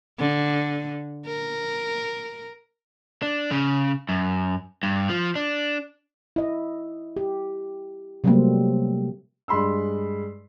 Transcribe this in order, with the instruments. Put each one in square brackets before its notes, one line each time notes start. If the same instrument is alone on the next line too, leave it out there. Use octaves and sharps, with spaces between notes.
[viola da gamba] D3
A#4
[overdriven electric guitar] D4
C#3
F#2
G2
F3
D4
[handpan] E4 D#5
G4
C3 F#3 G3 A3 A#3 C4
[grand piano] G2 G#3 B5 C6 E6